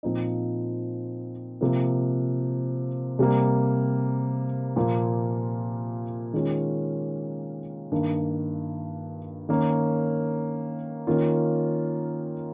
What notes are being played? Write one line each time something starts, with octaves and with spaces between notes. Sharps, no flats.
A#2 F3 C4 D#4
C3 F3 A#3
C3 G3 A#3
A#2 F3 A#3 F4
D#3 G#3 C#4 F4
G2 D#3 A#3
D#3 A#3 C#4
D#3 A#3 C#4 F4